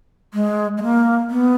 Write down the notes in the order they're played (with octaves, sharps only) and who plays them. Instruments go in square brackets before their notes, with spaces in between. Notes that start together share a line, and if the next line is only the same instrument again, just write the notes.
[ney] G#3
G#3
A#3
B3